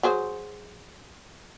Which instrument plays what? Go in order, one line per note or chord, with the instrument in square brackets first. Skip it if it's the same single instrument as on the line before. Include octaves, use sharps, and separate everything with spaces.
[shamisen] F#3 G#4 C5